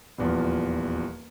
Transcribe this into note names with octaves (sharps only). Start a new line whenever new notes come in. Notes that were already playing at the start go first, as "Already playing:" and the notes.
D#1 E2 F3